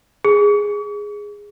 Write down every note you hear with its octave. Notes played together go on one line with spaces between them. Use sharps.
G#4